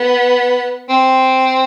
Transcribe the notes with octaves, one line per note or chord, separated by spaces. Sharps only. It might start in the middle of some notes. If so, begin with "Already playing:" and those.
Already playing: B3
C4